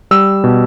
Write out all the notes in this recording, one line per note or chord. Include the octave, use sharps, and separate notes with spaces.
G3 E6
B2